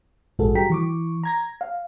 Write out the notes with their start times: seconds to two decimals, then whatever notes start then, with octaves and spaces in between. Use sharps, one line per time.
0.39 A#1 G#2 F#4 G#4 A4
0.55 G3 F#4 G5 A#5 B6
0.70 E3 C#6 D6
1.23 A#5 G#6 A#6
1.61 F5